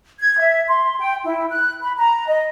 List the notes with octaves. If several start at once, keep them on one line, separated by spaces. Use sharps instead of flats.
G#6
E5
C6
G5
E4
F#6
B5
A#5
D#5